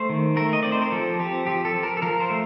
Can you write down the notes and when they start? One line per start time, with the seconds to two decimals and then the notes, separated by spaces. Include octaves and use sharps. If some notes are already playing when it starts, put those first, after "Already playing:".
Already playing: A3 C5
0.09 D#3
0.36 A3 A#4
0.53 D#5
0.63 C4 D5
0.72 C5
0.82 A#4
0.92 F3 A4
1.19 C4 G4
1.47 F3 G4
1.65 A4
1.74 F3
1.83 A#4
1.97 A4
2.02 F3 A#4
2.20 C5
2.30 A3